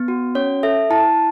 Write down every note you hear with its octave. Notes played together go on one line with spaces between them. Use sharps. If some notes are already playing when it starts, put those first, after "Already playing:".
Already playing: B3
F#4
C#4 C#5
A4 E5
E4 A5